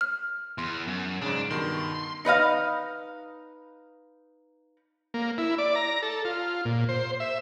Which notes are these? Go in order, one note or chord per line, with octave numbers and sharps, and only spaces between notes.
F6
E2 C6
F#2
G#2 C#3 D4
G2 B2 D#3 C6
D#4 B4 D#5 F5
A#3
E4
D5
A#5
A4
F4
A#2
C5
E5